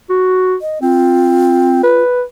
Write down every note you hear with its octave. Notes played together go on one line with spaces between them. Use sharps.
F#4
D#5
C4 F4
B4